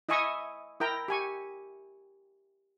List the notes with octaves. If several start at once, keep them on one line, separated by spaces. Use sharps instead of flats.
E4 D#5 E5 G#5 C#6 D#6
E4 A#4 G5 A#5
G4 G#5 C#6